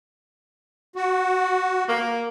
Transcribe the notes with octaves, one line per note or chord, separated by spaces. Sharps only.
F#4
A#3